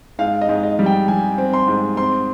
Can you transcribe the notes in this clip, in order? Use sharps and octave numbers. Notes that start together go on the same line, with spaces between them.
G#2 F5
D#5
G#2
D#5
G3
G5
G3 G#5
C4
C6
G#2
C4 C6